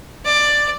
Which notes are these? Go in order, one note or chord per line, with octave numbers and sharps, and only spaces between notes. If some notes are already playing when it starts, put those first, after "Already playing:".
D5